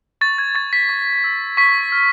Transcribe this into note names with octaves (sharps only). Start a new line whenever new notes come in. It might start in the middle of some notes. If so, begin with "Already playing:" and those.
C#6 A6
G#6
C#6 A6
B6
C#6
E6
C#6 B6
F6